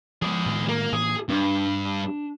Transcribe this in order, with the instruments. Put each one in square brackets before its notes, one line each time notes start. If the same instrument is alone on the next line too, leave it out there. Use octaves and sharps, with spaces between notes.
[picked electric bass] F3 G#3 [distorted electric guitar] G#4 D5
[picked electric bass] A2 D#3 G#3
[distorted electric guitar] A#3
[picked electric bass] A2 E3 A#3 [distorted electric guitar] G#4
[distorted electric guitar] G2 [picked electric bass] C4 D4